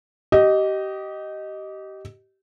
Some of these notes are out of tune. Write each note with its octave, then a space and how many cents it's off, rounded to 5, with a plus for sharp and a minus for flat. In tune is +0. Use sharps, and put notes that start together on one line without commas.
G4 -25 D#5 +0